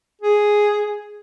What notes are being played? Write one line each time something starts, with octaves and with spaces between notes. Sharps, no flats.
G#4